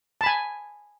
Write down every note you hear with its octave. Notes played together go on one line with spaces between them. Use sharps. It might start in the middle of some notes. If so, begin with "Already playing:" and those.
G#5 A5 B5